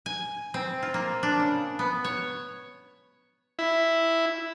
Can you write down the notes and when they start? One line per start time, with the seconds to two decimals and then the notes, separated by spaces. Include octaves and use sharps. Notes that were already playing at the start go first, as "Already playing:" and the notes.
0.06 G#5
0.54 C4
0.82 F4
0.94 A#3
1.23 D4
1.40 C#3
1.79 B3
2.04 C#5
3.59 E4